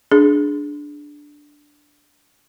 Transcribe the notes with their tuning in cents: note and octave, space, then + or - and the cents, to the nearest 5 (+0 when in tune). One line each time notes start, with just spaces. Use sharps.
D4 +0 G#4 +15